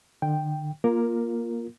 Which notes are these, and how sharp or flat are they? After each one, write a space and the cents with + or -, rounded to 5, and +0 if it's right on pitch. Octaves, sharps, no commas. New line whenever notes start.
D3 +40 G5 +0
A#3 +20 F4 +0 A#4 +0